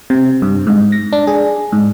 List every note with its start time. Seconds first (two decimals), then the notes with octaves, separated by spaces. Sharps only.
0.10 C3
0.42 G2
0.67 G#2
0.92 A#6
1.13 D4
1.27 G#4
1.72 G#2